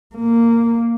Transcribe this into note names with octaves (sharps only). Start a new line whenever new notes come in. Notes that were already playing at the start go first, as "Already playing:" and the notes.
A#3